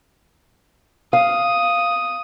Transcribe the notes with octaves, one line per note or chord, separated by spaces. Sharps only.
F5 D#6